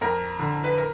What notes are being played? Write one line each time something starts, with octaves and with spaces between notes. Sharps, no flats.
F2 A#4
D3
B4
A#4